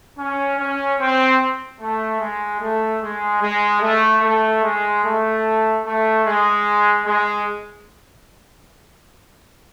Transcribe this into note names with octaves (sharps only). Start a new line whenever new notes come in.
C#4
C#4
C4
A3
G#3
A3
G#3
G#3
A3
A3
G#3
A3
A3
G#3
G#3